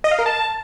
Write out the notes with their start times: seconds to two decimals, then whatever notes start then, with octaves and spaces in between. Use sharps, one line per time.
0.04 D#5
0.11 F5
0.19 A#4
0.26 A5